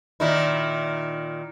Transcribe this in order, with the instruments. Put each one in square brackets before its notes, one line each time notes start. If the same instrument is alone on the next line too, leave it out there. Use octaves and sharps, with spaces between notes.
[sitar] A#2 D#3 E4